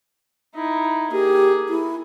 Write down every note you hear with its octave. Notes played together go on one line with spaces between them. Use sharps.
D#4 E4
A#3 G4 G#4
E4